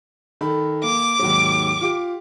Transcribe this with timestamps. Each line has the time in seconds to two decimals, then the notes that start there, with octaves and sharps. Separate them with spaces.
0.41 D#3 A4 B5
0.83 A#3 D6
1.19 D#2 G#2 F#3
1.81 F4 G4